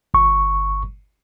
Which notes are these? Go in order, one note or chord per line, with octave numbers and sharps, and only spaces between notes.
G1 C#6